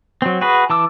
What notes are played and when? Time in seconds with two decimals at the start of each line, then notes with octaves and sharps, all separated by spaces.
0.22 F#3 C4
0.41 F#4 G#4 B4
0.70 E3 A5 D6 E6